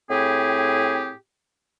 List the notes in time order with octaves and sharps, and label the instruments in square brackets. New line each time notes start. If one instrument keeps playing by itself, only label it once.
[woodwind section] A2 C4 E4 G4 G#4